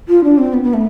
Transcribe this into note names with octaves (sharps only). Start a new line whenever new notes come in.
F4
D4
C4
B3
B3
A3